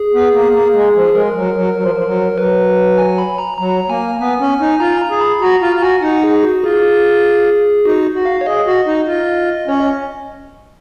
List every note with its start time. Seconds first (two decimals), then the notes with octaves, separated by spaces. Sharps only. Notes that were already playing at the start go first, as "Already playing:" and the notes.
Already playing: G#4
0.14 B3
0.34 A#3
0.54 A#3
0.75 G#3
0.95 F3
1.15 G#3 A#4
1.36 F#3
1.55 F#3
1.76 F#3
1.83 F3
1.98 F3
2.07 F#3
2.37 F#3 B4
2.98 G#5
3.18 B5
3.38 A#5
3.58 F#3 A#5
3.90 A#3 G#5
4.19 B3 G#5
4.40 C#4
4.61 D#4
4.80 F4 A#5
5.02 A#5
5.11 G#4
5.21 B5
5.42 F#4 A#5
5.62 F4 A#5
5.76 F4
5.82 F#4 G#5
6.02 D#4 F#5
6.24 G#4
6.43 F#4
6.64 F4 G#4
7.85 D#4 F#4
8.15 F#4
8.25 F5
8.41 C#5
8.46 G#4 D#5
8.67 F#4
8.87 D#4
9.07 F4
9.68 C#4 C#5
9.80 D#5